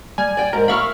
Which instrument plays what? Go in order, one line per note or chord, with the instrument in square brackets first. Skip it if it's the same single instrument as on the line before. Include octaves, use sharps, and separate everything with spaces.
[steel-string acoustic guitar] G3 [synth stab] G#5
[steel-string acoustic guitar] D5 G5
[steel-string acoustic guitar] G#2 [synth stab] A#4
[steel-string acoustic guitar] E4 F5 [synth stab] B5 C#6 F6